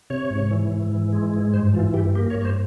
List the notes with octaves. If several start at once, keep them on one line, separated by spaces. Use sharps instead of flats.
C3 C#5
G#2
E3
G#2
E3
G#3
G#2
G2 C5
E3 F4
G2 G4
A#3 G4
C#5
G2
C#5
C5